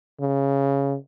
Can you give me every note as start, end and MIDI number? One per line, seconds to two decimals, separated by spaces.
0.20 0.96 49